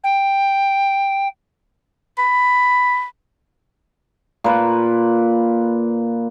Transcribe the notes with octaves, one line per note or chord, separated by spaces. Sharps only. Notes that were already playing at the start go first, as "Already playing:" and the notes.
G5
B5
A#2 B4